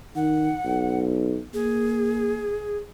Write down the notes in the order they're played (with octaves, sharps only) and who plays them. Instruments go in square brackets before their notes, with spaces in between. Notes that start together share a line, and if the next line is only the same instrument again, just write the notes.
[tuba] D#3 [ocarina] F#5
[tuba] B1
[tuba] A#3 [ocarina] G#4